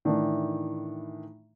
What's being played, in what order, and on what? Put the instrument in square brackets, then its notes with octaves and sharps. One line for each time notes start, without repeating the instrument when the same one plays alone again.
[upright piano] A2 D#3 E3 D4